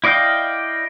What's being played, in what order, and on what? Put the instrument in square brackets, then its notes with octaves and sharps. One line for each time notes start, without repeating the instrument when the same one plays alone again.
[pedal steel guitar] E4 D5 D#5 F5 G5